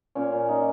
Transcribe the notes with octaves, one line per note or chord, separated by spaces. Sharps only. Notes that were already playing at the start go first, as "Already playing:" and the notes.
A#2 C#4
A#2
A#2 D#4